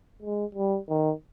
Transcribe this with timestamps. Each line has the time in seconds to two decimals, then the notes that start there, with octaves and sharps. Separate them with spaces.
0.22 G#3
0.55 G3
0.89 D#3